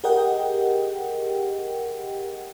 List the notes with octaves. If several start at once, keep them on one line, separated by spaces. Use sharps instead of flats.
G4 G#4 A#4 D#5 F#5 G5